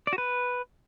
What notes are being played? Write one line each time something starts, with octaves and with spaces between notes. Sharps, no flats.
D5
F#4
B4